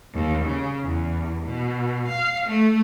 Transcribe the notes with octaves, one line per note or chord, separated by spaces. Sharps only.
D#2
C#3
E2
B2
F5
A3